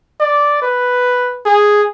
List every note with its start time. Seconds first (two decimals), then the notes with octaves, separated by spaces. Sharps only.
0.20 D5
0.62 B4
1.45 G#4